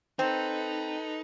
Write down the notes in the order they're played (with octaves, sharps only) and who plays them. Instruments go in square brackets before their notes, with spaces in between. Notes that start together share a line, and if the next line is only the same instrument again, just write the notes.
[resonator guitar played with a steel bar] C4 [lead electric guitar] D#4 [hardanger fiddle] A4 B4